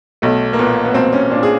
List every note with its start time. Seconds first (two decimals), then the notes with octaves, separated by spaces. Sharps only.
0.22 B1 A3
0.53 A#3
0.59 A#2 B3
0.85 B3
0.94 B1 C4
1.13 C#4
1.31 A#2 D4
1.43 G#4